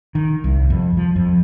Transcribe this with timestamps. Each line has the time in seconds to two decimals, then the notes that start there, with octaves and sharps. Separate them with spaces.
0.15 D#3
0.44 C2
0.70 F2
0.97 F3
1.16 F2